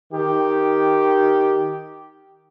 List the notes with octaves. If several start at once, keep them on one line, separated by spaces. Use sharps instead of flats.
D#3 G4